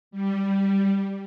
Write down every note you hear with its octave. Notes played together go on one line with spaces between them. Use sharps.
G3